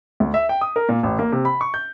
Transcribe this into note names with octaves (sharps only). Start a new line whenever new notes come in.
D2
E5
G5
D#6
A#4
A#2
A1
A#3
C3
B5
C#6
G6